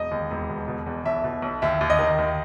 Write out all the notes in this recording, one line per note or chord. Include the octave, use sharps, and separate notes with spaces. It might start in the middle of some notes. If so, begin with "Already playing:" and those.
Already playing: E1 D#5
D#2
E1
B2
B2
E2
B1 E5
B2
B1
D#2 E5
D#2
D#5
D#3
D#2